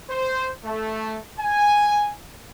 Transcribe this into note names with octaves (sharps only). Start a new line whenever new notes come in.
C5
A3
G#5